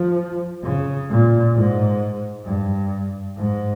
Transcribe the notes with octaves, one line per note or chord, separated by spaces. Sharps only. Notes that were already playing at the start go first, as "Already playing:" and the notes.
Already playing: F3
C#3
A#2
G#2
G2
G#2